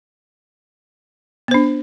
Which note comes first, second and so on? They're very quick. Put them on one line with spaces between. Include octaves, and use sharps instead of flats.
B3 C5 D4